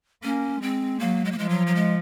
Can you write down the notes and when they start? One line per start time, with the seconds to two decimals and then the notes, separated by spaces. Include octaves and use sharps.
0.23 A#3 C#4
0.61 G#3 C4
1.00 F#3 A#3
1.25 G#3
1.31 A#3
1.37 F3 G#3
1.49 F#3
1.67 F#3
1.75 G#3